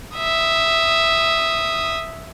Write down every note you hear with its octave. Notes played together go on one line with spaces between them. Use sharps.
E5 D#6